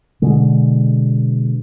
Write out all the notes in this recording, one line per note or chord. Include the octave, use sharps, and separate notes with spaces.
B2 D3 G#3